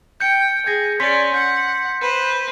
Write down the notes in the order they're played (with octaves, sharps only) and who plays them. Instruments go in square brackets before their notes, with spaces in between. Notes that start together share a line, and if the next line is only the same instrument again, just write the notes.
[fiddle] G5 [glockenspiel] G6 C#7
[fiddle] G#4 [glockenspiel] G#6 A#6
[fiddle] C#4 D5 [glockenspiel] C6 B6
[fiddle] F#5 [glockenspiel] G6
[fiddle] B4 C5